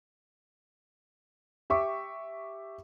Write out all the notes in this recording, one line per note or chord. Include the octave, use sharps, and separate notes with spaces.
G4 E5 C#6 D6